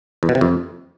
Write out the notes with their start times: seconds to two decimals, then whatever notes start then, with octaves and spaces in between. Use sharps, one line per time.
0.23 E2
0.29 B2
0.35 C3
0.41 F2